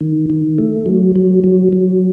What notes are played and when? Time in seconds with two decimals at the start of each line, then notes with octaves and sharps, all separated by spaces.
0.01 D#3
0.30 D#3
0.58 A3
0.86 F#3
1.16 F#3
1.44 F#3
1.72 F#3